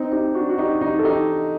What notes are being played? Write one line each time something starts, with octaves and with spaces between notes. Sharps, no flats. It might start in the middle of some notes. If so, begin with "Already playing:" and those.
Already playing: C4 D#4
D#4 G4
D4 F#4
F#4
D#4 G4
D#4 G4
A4
D#4 G4